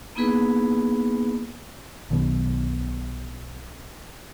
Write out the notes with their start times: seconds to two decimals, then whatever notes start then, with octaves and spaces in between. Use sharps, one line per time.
0.15 A#3 B3 D#4 E4 G#4 B4
2.10 B1 B2 D#3 B3